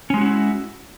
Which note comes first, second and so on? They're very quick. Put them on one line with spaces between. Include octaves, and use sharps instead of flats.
C#4 G#3 G4 F#4 E4